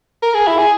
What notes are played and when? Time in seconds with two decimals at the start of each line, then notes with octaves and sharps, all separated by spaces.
0.23 A#4
0.34 G#4
0.47 E4
0.59 G#4